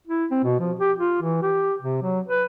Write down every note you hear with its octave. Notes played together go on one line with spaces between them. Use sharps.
E4
C4
B2
F3
G4
F4
E3
G4
C3
F#3
B4